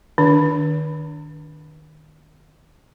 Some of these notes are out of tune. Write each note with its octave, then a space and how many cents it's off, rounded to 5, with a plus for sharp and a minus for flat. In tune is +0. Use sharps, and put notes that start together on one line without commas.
D#3 -20 D4 -15 C#5 +45